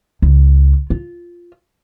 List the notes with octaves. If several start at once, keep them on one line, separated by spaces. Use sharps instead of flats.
C#2
F4